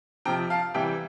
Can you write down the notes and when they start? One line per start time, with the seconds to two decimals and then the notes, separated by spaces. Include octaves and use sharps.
0.25 F2 C3 F3 G5 A#5
0.50 F5 A5
0.74 C3 E3 G3 E5 G5